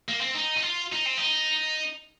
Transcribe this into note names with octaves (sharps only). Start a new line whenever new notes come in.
A#3
C4
D#4
D#4
F4
D#4
C4
D#4